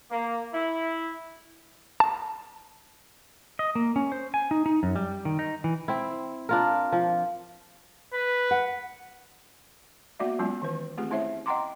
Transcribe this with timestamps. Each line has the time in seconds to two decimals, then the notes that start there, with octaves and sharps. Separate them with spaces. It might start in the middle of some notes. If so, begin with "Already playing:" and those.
0.11 A#3
0.54 E4
2.00 A5
3.59 D#5
3.75 A#3
3.96 C#4
4.12 C5
4.34 G#5
4.51 D#4
4.66 D#4
4.83 F#2
4.96 G3
5.25 D#3
5.39 D#4
5.64 E3
5.88 C4 E4
6.49 D4 F4 A#4
6.92 F3
8.14 B4
8.51 F#5
10.19 A#3 B3 F#4 D5 E5
10.39 F#3 G#3 B3 C#4 F4
10.62 D#3 E3 B4
10.98 A3 C4 F4 G4 G#4
11.10 A3 C#4 E4 C5 C#5 E5
11.46 D#5 F#5 G5 A#5 C6 D6